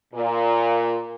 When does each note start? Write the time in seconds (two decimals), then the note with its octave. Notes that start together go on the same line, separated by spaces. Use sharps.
0.14 A#2